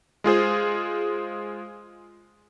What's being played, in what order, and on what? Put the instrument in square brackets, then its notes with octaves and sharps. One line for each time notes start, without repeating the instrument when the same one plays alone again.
[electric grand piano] G#3 F4 G#4 C5